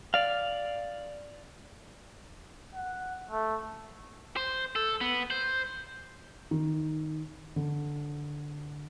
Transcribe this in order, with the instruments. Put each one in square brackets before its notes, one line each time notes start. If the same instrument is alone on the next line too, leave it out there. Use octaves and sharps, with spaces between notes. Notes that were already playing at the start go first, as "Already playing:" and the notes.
[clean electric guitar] D5 F5
[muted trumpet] F#5
A3
[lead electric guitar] C5
A4
B3
C5
[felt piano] D#3
D3